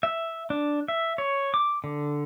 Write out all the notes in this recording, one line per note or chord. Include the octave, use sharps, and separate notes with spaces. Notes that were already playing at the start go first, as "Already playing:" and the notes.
E5
D4
E5
C#5
D6
D3